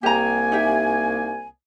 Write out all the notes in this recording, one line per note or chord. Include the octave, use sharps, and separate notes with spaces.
C2 A#3 G4 G#5 A#5
D#4 G4 E5